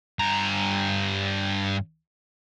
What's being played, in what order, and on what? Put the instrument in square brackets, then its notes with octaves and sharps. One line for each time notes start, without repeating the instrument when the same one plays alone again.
[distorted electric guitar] G2 A#5